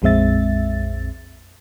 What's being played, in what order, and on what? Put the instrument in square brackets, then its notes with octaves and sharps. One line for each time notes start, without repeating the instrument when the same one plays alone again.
[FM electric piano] A#1 F2 G#3 C4 E5 A6